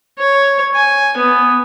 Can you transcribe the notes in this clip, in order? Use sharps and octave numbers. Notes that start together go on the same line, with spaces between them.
C#5
G#5
B3